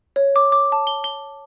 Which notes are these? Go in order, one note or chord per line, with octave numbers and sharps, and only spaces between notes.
C#5
D6
D6
A5
G7
G7